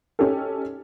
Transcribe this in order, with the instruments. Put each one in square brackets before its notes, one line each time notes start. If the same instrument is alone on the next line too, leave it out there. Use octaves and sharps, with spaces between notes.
[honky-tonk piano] C#4 D#4 G4 A4